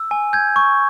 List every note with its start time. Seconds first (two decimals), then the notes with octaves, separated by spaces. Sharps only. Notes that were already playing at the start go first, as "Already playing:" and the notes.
Already playing: E6
0.11 G#5
0.33 G6 G#6
0.56 C#6